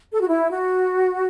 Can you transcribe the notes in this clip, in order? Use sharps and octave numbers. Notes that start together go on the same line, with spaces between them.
A4
F#4
E4
F#4